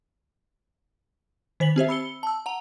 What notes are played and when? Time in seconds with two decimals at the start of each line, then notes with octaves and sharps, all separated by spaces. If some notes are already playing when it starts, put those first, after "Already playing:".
1.60 D#3 C5 B6 F#7
1.76 C4 G4 C5 E5
1.89 B5 E6 C#7 G7
2.23 A5 E6
2.46 F#5 A#5 F7